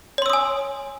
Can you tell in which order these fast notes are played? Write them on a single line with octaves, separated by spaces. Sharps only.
C#5 C6 E6 D#6 G#5